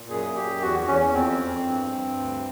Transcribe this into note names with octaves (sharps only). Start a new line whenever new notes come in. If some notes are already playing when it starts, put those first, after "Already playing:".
Already playing: A#2
F#2 G#4
F#2 G4
E2 F#4
E2 C#4
C#4
F2 C4
F2
G2
G2
D2